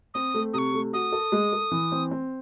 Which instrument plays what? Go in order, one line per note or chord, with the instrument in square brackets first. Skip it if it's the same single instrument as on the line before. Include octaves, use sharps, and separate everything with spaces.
[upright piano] C4 [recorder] D#6
[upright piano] A3
[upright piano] C3 [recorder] C#6 D#6
[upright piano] A3
[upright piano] F#4 [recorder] D#6
[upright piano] A4
G#3
A4
E3
C4
C4